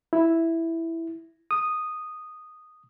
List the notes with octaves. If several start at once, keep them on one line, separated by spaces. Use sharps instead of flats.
E4
D#6